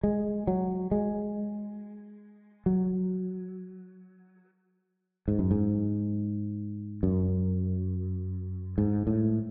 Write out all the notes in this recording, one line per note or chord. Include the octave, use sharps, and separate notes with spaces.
G#3
F#3
G#3
F#3
G#2
F#2
G#2
F#2
G#2
A2